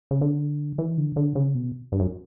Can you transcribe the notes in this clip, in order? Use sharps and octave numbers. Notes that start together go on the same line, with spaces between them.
C#3
D3
E3
D3
D3
C#3
B2
G2
F#2